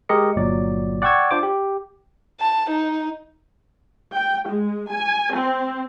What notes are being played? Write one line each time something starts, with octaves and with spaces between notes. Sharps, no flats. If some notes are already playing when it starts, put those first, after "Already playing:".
G#3 G4 A#4 D#5 C#7
G1 A#2 F#3 D5
D5 F#5 G5 C#6 E6 G#6
D4 F4 C5 D6
G4
A5
D#4
G5
G#3
G#5
C4